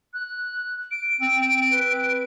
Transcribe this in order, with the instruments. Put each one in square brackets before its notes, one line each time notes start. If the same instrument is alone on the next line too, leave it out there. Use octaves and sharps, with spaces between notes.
[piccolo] F#6
D7
[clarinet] C4
B4